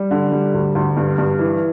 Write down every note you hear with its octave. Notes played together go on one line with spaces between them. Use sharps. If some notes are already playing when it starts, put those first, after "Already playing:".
Already playing: G3
D3
G3
D2
D2
G2
G2
E3